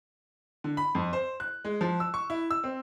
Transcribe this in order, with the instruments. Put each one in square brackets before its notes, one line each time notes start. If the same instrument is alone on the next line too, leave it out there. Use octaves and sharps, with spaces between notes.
[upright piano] D3
B5
F2
C5
F#6
G#3
F3
E6
C#6
E4
E6
C4